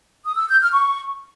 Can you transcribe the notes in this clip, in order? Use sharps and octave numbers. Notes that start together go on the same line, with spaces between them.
D#6
E6
G6
F6
C#6